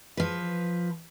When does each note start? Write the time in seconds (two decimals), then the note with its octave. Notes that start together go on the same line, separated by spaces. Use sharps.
0.17 F3 B4